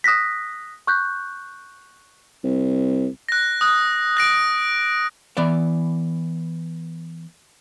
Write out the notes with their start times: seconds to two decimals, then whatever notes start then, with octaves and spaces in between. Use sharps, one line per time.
0.04 D#6 F#6 A#6 B6
0.87 C#6 F#6 G6
2.44 C2
3.29 F#6 A#6
3.61 D#6 F#6
4.17 F#6 A#6 D7
5.37 E3 B3 D5 E5